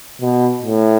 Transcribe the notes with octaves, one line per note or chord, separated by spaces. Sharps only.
B2
A2